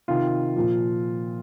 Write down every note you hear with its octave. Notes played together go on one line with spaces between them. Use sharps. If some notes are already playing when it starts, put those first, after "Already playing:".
C3 D#3 F4
A#2 F3